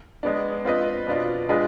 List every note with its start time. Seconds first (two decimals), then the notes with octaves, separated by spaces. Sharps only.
0.23 G#3 B3 D4
0.65 C4 F4 B4 D#5
1.07 B2 B3 D4 F4
1.49 G#3 D4 F4 G#4 B4